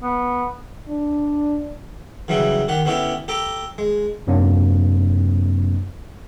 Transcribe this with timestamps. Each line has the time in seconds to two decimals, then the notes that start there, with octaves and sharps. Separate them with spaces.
0.02 B3
0.89 D4
2.28 C#3 E3 F#3 G3 E4
2.68 D#3 G4 F#5
2.85 D3 B3 C#4 E4 G4 D5
3.28 G4 A4 A#5 D6
3.78 G#3
4.27 F#2 C3 F#3 A#3 C4 D4